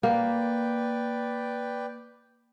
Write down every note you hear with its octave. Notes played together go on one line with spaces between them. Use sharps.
A#3 B4 D5 G5